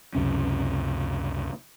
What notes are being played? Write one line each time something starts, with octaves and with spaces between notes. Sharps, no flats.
C#2 F#2 C3 C#4